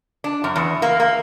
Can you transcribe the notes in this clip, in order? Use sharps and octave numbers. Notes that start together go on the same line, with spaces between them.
D4
F#2
E2
A#3
A#3